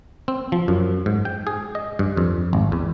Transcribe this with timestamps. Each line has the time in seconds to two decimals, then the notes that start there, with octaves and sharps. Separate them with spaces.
0.28 C4
0.52 F3
0.68 F#2
1.06 G#2
1.25 G5
1.47 G#4
1.75 D#5
1.99 G2
2.17 F2
2.53 G#1
2.72 E2